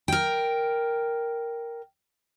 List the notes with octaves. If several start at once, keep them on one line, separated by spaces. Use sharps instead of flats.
A#4 G5